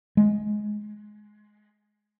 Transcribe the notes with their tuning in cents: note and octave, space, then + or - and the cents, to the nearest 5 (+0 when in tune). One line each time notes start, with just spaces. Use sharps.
G#3 +15